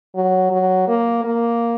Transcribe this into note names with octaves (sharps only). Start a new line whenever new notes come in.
F#3
F#3
A#3
A#3